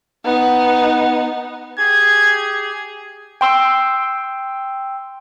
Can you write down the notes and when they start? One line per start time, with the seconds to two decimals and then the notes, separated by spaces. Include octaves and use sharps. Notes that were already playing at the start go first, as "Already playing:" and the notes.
0.24 B3 D#4
1.79 G4 G#4 G#6
3.41 G5 C6 E6